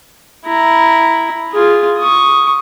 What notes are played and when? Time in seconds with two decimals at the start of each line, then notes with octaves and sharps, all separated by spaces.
0.46 E4 A#5
1.53 F4 G#4
1.98 C#6 D#6